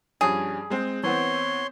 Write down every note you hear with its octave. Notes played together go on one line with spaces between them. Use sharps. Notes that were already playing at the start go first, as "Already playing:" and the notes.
G2 F3 C#4 G#4
G#3 C4
E3 B3 C4 C#5 C6